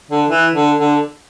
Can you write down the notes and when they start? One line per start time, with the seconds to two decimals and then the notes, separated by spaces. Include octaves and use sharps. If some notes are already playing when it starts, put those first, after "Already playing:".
0.10 D3
0.29 E3
0.54 D3
0.78 D3